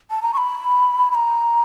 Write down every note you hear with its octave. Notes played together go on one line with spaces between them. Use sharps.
A5
A#5
C#6
B5
B5
A#5